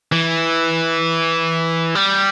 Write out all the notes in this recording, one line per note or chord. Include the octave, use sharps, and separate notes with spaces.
E3
G3